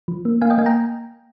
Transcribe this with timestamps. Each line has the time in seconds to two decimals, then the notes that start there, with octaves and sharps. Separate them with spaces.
0.08 F3
0.25 A#3
0.41 A#3 F5 G#5
0.50 D#5 G5
0.58 A#3 F5 G#5
0.66 G5 A#5